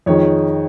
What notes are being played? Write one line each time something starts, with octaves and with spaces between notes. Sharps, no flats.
F2 D#3 G#3 C#5